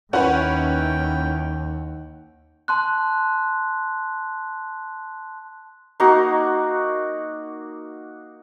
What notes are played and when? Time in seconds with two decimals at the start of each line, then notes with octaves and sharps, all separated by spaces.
0.13 D#2 C#4 E4 B4 F#5 G5
2.68 A5 C6 F#6
6.00 A#3 D#4 F#4